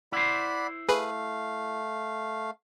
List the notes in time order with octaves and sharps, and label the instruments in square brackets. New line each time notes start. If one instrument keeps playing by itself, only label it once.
[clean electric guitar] E4 C5 [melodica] D5 F#5 B5
[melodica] A3 F5 [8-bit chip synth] G#4 B4